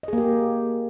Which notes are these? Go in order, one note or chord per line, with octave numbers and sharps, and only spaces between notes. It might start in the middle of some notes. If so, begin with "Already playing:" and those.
A#3 G4 G#4 D#5